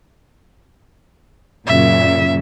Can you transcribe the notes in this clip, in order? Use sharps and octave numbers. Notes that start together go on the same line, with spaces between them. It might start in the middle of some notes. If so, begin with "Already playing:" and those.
F#2 A#2 C#3 E5